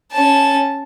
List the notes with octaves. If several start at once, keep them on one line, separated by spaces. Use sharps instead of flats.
C#4 A5